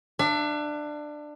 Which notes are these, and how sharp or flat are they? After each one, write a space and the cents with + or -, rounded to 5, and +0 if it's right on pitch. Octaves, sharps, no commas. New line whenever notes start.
D4 +20 E5 +45